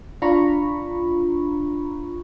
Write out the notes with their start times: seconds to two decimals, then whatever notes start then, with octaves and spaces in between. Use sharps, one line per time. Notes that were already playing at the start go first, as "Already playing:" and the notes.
0.22 D4 F4 A#5 B5 C#6